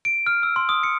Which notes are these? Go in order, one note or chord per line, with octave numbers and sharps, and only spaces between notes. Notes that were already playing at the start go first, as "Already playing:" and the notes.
D7
F6
E6
C6
D#6
C#7